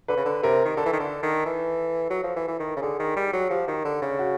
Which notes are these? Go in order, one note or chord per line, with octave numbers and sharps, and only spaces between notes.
D3 B4
C#3
D3
C3 A#4
D#3
D3 A4
E3
D#3
D3
D#3
E3
F#3
F3
E3
E3
D#3
C#3
D3 G#4
D#3
G3
F#3
F3 G4
D#3
D3
C#3
F#4